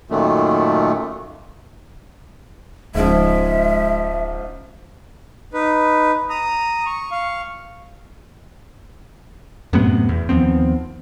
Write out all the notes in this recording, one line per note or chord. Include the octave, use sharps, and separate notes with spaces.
F#2 A#2 D#3 A3
D1 G#2 C#3 F3 G#3 E5
D#4 B4
A#5 D#6
C#6
F5 C#6
F#2 A2 C3 B3
E2
D#2 F3 B3 C4